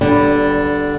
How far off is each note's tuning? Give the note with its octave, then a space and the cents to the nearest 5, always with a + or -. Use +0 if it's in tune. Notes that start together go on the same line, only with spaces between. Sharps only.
D3 +0 G3 -25 B3 +0